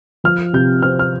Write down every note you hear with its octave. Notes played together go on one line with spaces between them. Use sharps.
F3 F6
C3 G6
C4 F6
F6